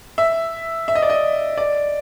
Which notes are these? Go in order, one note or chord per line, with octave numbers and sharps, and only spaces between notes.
E5
E5
D#5
D5
D#5
D5